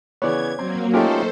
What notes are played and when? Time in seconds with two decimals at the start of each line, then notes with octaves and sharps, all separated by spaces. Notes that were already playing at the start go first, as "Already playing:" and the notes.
0.22 C#3 E3 B3 C#5 D5 G#6
0.59 F#3 A#3 C4
0.94 A3 C#4 D#4 F4 G4 A4 A#4 C5